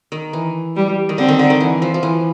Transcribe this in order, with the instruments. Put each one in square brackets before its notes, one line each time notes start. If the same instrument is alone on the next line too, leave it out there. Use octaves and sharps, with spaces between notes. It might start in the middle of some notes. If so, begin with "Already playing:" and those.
[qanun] D#3
E3
[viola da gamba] G3
[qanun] D#3
[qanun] D3 [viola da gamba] C4
[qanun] D#3
D3
D#3
E3
F3
F3
E3